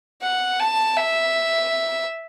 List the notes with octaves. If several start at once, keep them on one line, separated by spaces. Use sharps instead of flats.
F#5
A5
E5